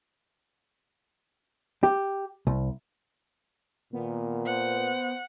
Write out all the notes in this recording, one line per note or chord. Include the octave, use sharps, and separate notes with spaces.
G4
C2
A#2 D#3 B3
C5 F#5